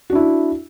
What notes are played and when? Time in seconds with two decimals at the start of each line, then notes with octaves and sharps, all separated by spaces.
0.10 F#4
0.13 D4
0.15 E4